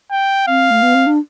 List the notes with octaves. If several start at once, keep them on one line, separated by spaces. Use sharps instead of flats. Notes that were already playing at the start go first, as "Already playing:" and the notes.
G5
C4 F5
A3
B3
C4
D4